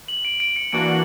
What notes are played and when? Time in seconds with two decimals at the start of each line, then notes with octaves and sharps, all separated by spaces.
0.08 F#7
0.25 D7
0.40 D7
0.56 C#7
0.72 E3 A#3 D4 F#4 D7